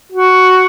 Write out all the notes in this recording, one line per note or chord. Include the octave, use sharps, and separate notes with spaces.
F#4